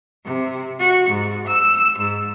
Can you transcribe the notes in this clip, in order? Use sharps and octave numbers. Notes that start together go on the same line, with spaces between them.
C3
F#4
G#2
E6
G#2